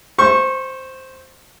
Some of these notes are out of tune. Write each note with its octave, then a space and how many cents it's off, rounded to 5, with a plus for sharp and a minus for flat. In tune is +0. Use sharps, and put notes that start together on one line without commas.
C5 +0 C#6 -25